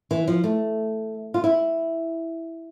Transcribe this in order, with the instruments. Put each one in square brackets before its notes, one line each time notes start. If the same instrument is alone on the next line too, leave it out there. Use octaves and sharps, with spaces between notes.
[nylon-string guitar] E3
F3
A3
F4
E4